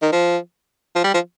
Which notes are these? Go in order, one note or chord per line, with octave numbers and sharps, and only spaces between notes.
D#3
F3
F3
G3
F3